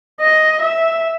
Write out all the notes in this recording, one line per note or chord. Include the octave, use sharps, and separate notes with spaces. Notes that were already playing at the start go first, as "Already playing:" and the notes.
D#5
E5